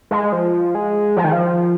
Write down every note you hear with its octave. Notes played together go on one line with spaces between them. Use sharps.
G#3
F3
G#3
F3
D#3
F3